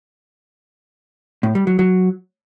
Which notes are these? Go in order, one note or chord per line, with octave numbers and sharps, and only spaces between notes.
A2
G3
F#3
F#3